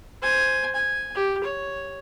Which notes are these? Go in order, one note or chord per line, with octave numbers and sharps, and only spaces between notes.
C5 G#5
G#5
G4
C#5